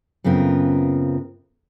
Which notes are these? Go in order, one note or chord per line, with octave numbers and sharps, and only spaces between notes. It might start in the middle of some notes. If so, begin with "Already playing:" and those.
F#2 C#3 B3 C4 F4 A#4